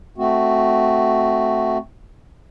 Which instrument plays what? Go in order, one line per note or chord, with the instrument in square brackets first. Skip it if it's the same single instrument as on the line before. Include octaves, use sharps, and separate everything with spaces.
[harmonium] A3 C4 F#4